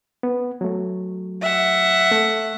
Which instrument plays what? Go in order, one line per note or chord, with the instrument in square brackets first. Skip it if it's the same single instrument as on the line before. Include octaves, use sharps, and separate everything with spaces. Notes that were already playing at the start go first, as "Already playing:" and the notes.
[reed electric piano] B3
F#3 A3
[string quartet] E5 F#5
[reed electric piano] A3